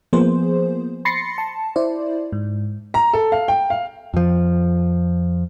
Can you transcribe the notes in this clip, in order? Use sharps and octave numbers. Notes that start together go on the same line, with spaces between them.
F3 A#3 B3 G#4 C5
B5 C6 A6 A#6 C7 C#7
A5
E4 C5 D5
G#2
A#5
A4
F5
G5
F5
F2 F3